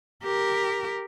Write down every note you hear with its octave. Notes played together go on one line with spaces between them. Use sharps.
G4 A#4